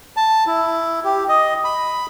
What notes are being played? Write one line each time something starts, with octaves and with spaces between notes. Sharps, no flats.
A5
E4
G4
D#5
B5